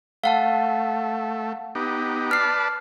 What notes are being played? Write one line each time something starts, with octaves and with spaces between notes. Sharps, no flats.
A3 F5 F#5 A5
B3 D#4 G4
B4 D5 A5 F6 C7